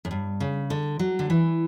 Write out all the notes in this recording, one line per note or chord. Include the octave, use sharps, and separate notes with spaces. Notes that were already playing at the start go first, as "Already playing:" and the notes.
F#2
G2
C#3
D3
F#3
D3
E3